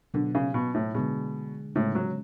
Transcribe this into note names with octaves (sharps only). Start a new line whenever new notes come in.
B2 D3 F#3 B3
C#3
B2
A2
B2 D3 G#3 D4 G#4
A2 C#3 G#3 B3
F#3